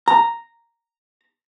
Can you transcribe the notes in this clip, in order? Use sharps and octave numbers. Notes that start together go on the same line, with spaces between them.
A#5